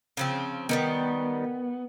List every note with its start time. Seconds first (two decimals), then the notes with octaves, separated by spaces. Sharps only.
0.17 C#3 F3 C4
0.69 D#3 F#3 G3 B3